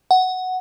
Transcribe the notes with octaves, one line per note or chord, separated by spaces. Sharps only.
F#5